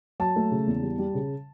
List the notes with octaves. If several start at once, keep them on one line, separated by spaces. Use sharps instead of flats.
F#3 A5
A3
C#3
E2
G3
G3
C#3